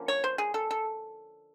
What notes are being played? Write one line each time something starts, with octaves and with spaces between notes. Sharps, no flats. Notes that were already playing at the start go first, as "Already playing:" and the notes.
Already playing: D3 F3 A#3 C#4
C#5
C5
G#4
A4
A4